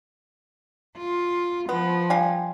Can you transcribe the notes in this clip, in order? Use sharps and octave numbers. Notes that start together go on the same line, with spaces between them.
F4
F3 B3
G3 F5 G#5